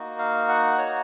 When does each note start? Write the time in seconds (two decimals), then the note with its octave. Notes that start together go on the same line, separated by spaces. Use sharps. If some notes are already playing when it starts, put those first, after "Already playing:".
Already playing: A#3 D#4 F#4
0.19 F5
0.49 F#5
0.78 C#5